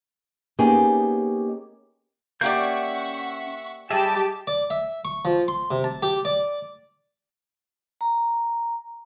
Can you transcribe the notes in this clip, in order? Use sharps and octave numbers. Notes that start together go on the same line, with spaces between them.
A#3 B3 C#4 D#4 G4 G#4
A#3 C#4 G4 D5 E5 F#5 C#6 G6
G3 G4 G#4 D#5 E5 A5
D5
E5
C#6
F3
C6
C3
A5
G4
D5
A#5